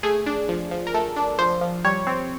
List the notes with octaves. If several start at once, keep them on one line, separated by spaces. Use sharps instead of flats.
A3 G#4
D4
F3
F3
A#4
A3 A4
D4
F3 C5
F3
G3 C#5
C4